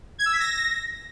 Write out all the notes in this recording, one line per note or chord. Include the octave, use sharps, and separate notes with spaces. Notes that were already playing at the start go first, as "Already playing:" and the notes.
G#6
E6
B6
A#6